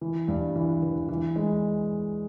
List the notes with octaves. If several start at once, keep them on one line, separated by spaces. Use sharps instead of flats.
E3
G2
E3
E3
E3
G#3